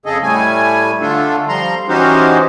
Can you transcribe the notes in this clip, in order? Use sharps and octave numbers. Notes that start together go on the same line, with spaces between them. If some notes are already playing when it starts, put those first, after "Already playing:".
F2 C#3 G#4 A4 D#5
A2 G3 A3 G#5
D3 A3 D4 F4 A4
F3 G3 A#5 C6
E3 C#4 D#4 F#4 G4 C5